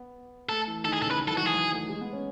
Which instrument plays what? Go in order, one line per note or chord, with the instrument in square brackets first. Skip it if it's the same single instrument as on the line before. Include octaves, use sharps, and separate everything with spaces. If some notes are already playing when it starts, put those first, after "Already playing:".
Already playing: [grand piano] B3
[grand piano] A3 [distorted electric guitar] A4
[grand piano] E3
[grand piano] D#3 [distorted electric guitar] A4
[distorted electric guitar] G#4
[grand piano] C#3 [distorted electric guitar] A4
[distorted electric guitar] B4
[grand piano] D#3
[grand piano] F#3 [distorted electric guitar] A4
[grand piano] E3
[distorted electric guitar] F#4
[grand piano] F#3
[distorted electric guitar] G#4
[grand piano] F#3
A3
G#3
B3
C#4